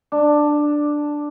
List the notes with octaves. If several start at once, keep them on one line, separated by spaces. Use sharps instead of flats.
D4